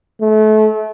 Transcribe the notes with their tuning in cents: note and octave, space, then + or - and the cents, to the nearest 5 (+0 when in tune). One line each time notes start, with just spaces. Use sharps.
A3 -30